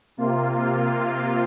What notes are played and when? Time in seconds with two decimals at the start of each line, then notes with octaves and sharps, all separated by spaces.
0.17 C3 A#3 F4